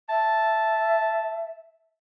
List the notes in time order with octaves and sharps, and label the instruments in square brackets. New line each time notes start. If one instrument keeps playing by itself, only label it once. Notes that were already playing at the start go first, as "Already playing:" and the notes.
[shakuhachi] E5 [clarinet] A5